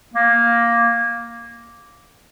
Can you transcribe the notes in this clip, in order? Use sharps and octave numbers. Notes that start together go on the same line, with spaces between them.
A#3